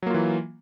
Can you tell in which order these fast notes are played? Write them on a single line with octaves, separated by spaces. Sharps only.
F#3 A#3 F4 E3